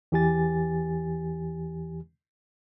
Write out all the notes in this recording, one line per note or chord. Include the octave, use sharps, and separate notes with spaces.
E2 E3 G4 G#5 A6